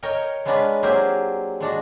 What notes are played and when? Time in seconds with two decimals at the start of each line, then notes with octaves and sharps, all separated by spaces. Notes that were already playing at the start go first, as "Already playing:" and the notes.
0.03 A#4 C#5 D#5 G5
0.45 G#3 B3 C#4 D4 A#4 B4
0.83 F#3 A#3 C4 G4 G#4 A#4
1.60 G#3 D4 F#4